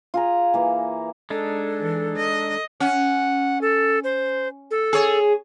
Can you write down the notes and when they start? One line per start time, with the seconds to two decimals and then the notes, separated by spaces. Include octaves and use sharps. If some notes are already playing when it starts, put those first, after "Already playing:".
0.14 F4 G#4 A#5
0.54 E3 A#3
1.30 G#3 D4 D#4 A4
1.80 E3
2.16 D#5
2.80 C#4 F#5
3.61 A4
4.04 C5
4.71 A4
4.93 G#4 C#5